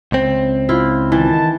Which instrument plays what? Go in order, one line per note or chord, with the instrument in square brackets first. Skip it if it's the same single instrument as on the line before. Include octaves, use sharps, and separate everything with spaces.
[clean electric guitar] C#2 C4
[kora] E4 F4
[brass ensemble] D#3 A5 [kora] E3